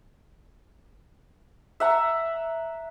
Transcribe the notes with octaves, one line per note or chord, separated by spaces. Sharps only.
E5 F#5 A#5